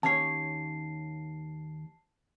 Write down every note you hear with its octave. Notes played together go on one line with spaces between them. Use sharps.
D#2 C#4 C#5 A5 C7